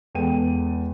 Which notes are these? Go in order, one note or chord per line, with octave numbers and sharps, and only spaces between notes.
E2 G#3 A4 B4 G5 D#7